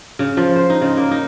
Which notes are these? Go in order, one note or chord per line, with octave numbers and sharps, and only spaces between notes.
C#3
F3
C5
D#4
C#3
A#3
D#4